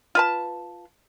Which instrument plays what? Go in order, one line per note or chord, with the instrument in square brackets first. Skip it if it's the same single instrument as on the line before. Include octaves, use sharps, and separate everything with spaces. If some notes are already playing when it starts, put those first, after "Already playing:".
[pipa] F4 B4 A5